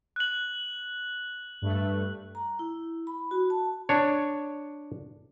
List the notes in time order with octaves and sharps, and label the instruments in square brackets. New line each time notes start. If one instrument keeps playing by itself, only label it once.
[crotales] F#6 F#7
[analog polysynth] G2 A3
[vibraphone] A#5
E4
B5
F#4
A5
[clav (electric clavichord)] D4 C#5